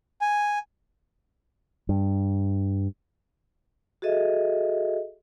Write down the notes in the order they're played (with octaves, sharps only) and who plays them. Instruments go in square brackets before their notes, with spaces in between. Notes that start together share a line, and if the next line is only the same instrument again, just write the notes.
[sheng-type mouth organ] G#5
[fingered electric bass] G2
[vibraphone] F#4 G#4 A4 D#5 E5